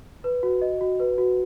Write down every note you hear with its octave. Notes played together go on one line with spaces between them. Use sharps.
B4
F#4
D#5
F#4
B4
F#4